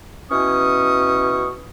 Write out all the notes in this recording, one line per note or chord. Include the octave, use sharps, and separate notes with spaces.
B2 E3 C#4 C#6 D#6